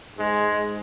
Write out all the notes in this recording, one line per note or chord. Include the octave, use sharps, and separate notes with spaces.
G#2 G#3